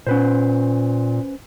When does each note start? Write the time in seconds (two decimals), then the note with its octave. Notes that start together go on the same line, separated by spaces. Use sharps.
0.07 A#2 C#4 B4 C5